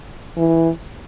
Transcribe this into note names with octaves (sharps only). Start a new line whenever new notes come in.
E3